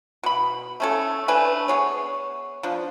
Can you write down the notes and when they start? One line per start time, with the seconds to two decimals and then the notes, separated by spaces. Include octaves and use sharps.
0.23 B2 B5
0.80 A3 C#4 A4
1.28 A3 D4 B4 G#5
1.68 B3 G#4 C#5
2.63 F3 D4